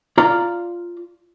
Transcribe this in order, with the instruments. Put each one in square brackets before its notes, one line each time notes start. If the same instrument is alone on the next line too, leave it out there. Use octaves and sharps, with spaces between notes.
[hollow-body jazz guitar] F4 D5 F5 A#5